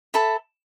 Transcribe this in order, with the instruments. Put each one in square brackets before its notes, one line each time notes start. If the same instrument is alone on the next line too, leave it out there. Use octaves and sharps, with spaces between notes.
[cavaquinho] A4 E5 B5